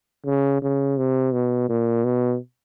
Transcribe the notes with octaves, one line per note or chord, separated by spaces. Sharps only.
C#3
C#3
C3
B2
A#2
B2